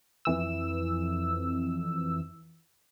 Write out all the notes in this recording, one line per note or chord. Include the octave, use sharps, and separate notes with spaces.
F2 E3 E6